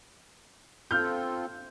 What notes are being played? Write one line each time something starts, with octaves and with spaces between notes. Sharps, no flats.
C4 F4 A4 F6 G6